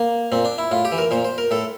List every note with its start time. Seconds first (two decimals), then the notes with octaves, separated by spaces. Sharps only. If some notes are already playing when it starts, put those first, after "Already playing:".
Already playing: A#3
0.32 A#2 C4
0.45 D4
0.58 E4
0.71 A2 F4
0.85 G4
0.92 E3
0.98 A#4
1.11 A#2 C5
1.24 C5
1.38 A#4
1.51 A2 A4